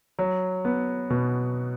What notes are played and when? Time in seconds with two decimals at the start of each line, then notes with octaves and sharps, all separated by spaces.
0.19 F#3
0.65 B3
1.10 B2